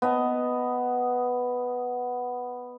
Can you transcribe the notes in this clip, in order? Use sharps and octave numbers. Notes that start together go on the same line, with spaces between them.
B3 D#5 A5